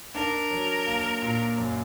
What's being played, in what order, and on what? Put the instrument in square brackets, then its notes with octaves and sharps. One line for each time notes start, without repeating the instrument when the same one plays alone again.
[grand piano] D4 [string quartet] A#4
[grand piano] F#3
A#3
A#2
F#2